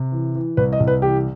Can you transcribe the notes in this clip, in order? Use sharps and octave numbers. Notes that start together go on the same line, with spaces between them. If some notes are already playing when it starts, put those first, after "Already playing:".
Already playing: C3
E3
E3
C2 B4
D#5
C2
B4
E3 G4